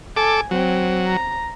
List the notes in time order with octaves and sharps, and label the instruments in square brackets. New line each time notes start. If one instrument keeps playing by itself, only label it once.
[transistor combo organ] A4 D6 [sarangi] G#5
[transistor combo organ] F#3 [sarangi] C4
[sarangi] A#5